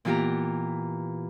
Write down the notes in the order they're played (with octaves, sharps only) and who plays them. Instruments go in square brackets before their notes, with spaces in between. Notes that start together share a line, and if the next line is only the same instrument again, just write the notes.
[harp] A#2 E3 B3 F4 G4 A#5